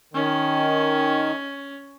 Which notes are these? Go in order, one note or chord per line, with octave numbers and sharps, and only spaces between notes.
D#3 C#4